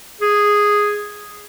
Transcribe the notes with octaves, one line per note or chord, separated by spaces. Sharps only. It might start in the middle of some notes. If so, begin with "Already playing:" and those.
G#4